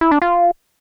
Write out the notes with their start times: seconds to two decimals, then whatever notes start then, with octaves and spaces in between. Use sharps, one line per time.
0.01 E4
0.11 D4
0.22 F4